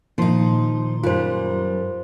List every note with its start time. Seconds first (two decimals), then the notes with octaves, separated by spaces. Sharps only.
0.18 A#2 D#3 F3 D#4 C6
1.03 F#2 G3 F4 C5